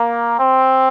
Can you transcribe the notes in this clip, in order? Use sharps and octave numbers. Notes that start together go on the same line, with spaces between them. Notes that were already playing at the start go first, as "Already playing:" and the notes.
Already playing: A#3
C4